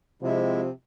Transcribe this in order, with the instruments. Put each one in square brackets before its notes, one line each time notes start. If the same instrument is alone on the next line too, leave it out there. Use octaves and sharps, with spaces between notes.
[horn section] C3 [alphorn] F3 [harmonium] G#3 E4